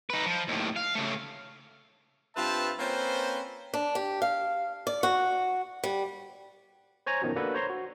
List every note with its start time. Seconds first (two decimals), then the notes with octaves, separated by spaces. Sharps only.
0.10 D#4 B4
0.26 F3
0.48 D#2 A2
0.76 F5
0.96 C#3 A3
2.36 G2 C4 F4 B4 E5 A5
2.78 A#3 C4 C#4 F4 B4 C5
3.74 D4
3.95 G4
4.22 F5
4.87 D5
5.03 F#4
5.84 G3
7.06 C5 C#5 G#5 A#5
7.22 F#2 B2 D#3 F3 F#3
7.36 A#3 D4 F#4 A4 B4 F#5
7.54 C5 C#5 A#5 C6
7.70 F#4